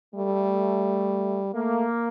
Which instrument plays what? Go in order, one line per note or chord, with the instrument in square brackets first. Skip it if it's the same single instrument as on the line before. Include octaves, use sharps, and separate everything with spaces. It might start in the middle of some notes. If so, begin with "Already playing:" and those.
[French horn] G3 [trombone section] A3
[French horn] A3 [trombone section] A#3